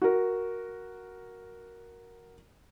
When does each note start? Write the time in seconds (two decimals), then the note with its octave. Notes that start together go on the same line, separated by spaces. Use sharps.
0.02 F#4 A#4